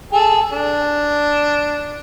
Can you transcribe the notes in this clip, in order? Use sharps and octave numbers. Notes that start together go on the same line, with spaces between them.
G#4 A4
D4